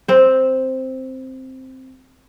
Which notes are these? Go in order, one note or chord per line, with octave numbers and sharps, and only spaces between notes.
C4 C5